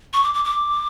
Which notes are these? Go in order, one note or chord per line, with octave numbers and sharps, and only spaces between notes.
C#6
D6
D6
D6